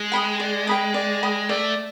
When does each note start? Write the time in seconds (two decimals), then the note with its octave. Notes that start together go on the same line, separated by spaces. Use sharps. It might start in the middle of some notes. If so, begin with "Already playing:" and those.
Already playing: G#3
0.12 G5 B5 D#6
0.40 D5
0.67 G5 B5 D#6
0.94 D5
1.23 G5 B5 D#6
1.49 A3 D5